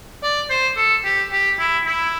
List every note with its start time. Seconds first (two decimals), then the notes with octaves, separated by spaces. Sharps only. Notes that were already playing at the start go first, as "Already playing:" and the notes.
0.23 D5
0.50 C5
0.77 A4
1.05 G4
1.32 G4
1.59 E4
1.87 E4